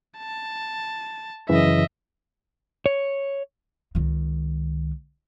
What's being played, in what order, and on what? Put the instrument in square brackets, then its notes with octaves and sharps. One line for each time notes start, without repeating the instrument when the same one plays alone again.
[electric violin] A5
[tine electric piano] F#2 C#3 E3 [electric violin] D#5 E5
[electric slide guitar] C#5
[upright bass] C#2 D#3